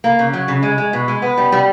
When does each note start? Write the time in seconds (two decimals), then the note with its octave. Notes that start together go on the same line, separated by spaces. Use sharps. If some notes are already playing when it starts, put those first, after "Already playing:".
0.04 A#3
0.19 C#3
0.33 F#3
0.48 C#3
0.62 G#3
0.78 G#3
0.93 B2
1.08 G#3
1.22 B3
1.38 G3
1.52 G3